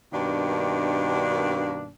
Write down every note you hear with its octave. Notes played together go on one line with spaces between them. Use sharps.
G2 B2 D#3 A#3 D4